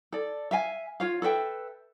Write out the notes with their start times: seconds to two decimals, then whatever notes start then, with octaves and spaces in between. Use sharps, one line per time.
0.13 A4 D5
0.51 E5 F5 G#5
1.00 F4 C#5 F5
1.22 A4 B4 E5 G5